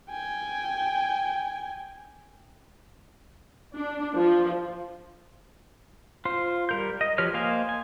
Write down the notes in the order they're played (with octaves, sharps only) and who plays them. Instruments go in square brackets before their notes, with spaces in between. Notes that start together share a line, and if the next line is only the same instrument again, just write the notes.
[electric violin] G5 G#5
[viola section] D4
F3
[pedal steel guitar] F4 C5
G3 A#4 G6
D#5
F3 G4 B4 C#5 F6
A#3 C5 D#5 F5 G#5
G#5